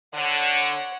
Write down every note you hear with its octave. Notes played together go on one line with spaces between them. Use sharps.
D3 C#5 F#5